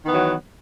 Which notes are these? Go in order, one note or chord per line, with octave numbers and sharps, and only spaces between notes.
D#3 E3 F#3 B3